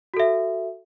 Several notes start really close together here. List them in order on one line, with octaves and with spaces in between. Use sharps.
F#4 A4 E5